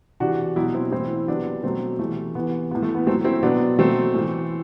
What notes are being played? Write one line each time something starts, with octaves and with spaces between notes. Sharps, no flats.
C3 E3 D4 F#4
B2 F#3 E4 G4
C4 E4
A2 E3 C4 E4
C3 F#3 B3 D4
B2 F#3 A3 C4
C3 E3 A3
C3 E3 B3
A2 E3 B3
A3
B3
A2 F#3 A3 C4
C4 E4
B2 F#3 B3 D4
B2 F#3 A3 C4
A2 E3